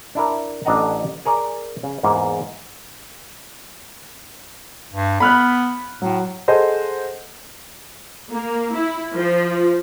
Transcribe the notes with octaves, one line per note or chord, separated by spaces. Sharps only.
D4 E4 A#4
A1 D4 A4 D#5 F#5 A#5
G#4 A#4 C#5 D5
C#3
E2 G#2 A#3
G2
B3 B5 F6 F#6
A2 F#3
G#4 A4 C5 D#5 F#5
A#3
E4
F3